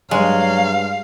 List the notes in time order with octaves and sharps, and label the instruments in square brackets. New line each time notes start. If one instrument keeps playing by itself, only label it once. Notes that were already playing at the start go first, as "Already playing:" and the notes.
[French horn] G2 [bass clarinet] F#3 [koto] G#3 [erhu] F5